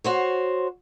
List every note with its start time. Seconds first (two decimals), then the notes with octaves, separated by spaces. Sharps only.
0.04 F#4 C5 C#5